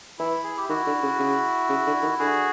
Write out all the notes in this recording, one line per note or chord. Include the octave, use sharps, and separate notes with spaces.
E3 E4
G#4
G4
D#3 E4 F#4
D3
C#3
C#3
C#3
D3
D#3
D3 F#4 G#4